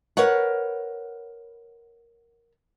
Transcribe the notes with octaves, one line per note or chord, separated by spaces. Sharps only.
A#4 B4 C#5 F#5